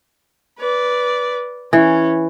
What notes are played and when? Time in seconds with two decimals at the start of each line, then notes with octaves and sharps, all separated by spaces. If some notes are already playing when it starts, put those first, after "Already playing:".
0.58 B4 D5
1.73 E3 C#4